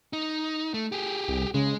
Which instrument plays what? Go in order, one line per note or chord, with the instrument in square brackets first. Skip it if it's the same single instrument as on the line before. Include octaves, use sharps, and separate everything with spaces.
[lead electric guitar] D#4
A3
G4 G#4
[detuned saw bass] C2
[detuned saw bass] C#3 [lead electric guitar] G#3